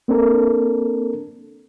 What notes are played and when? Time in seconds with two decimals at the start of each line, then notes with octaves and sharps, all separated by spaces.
0.08 A#3 C4 D4 A4 A#4